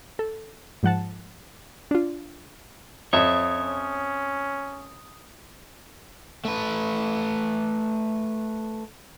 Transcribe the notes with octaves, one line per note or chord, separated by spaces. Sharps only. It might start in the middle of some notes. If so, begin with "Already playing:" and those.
A4
G#2 F3 F#5 A5
D4 F4
F2 C#5 E5 D#6
C#4
A3 B4